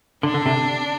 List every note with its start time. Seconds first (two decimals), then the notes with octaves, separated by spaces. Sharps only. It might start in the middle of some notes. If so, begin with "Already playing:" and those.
0.23 D3 D4
0.34 D3
0.46 C3